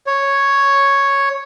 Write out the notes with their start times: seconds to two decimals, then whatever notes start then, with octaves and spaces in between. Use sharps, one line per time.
0.07 C#5